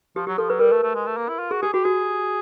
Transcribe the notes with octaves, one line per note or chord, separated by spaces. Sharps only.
F3 G4
F#3 G4
F3 A4
F#3 B4
G3 A#4
A3 B4
A3
G#3
A3
A#3
E4
F4
F#4 G#4
G4 G#4
F#4 G4
F#4 G#4